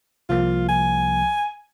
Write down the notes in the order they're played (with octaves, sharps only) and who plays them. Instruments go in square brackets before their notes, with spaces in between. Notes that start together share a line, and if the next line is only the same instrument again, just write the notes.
[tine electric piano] C2 F3 A#3 [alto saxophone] F4
[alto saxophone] G#5